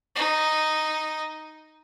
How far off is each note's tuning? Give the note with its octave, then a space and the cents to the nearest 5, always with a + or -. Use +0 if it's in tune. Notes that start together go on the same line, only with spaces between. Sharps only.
D#4 -5